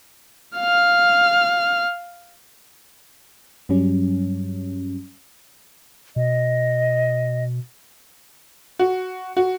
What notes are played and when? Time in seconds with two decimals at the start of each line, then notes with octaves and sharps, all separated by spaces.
0.57 F5 F6
3.69 G2 F#3 G3 C#4
6.16 B2 D#5
8.79 F#4
9.37 F#4